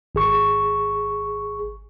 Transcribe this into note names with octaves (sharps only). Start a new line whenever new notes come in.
G#1 G#4 C#6